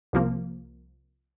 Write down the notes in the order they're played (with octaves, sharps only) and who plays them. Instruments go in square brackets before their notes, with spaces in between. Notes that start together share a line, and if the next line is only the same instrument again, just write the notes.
[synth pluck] C2 C3 F3 A#3